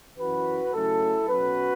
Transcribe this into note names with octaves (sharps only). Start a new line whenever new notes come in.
F#2 E3 C#4 F#4 B4
C#3 F#3 A3 C#4 E4 A4
B2 F#3 C#4 F#4 B4